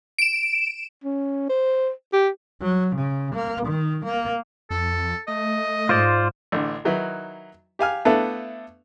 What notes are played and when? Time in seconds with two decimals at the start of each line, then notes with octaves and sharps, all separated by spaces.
0.19 D7 E7
1.04 C#4
1.50 C5
2.13 G4
2.61 F#3
2.95 C#3
3.35 A#3
3.66 D#3
4.05 A#3
4.71 F2 A4
5.28 A3 D#5
5.89 G#2 F4 C5 D5
6.52 A1 D3
6.85 D#3 F#3 D#4 E4 B4
7.79 G4 F5 G#5 F6
8.05 A3 B3 D4 E4 A4 F5